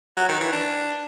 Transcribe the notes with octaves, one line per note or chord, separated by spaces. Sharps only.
F#3
D#3
E3
D4